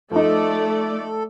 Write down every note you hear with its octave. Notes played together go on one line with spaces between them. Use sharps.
F3 A3 D#4 A4 D5